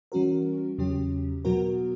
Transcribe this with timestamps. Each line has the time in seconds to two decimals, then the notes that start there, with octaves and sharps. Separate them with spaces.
0.12 E3 G3 C#4 F#4 A#4
0.78 E2 C#3 F#3 C#4 G4
1.45 B2 F#3 B3 F#4 A#4